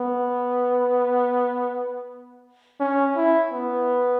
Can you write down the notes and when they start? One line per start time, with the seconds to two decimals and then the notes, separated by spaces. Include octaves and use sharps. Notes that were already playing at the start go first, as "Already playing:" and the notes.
Already playing: B3
2.80 C#4
3.16 E4
3.52 B3